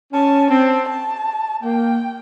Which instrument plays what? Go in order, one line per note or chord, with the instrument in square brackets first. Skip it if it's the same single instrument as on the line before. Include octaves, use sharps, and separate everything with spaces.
[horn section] C#4 [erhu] A5
[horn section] C4 [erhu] A5
[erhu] A5
[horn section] A#3 [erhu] G5